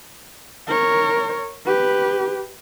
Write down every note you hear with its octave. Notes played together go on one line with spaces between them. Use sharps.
A#4 C#5
G4 B4